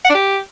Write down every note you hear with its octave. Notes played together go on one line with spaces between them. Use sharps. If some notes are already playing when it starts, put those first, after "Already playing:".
F#5
D4
G4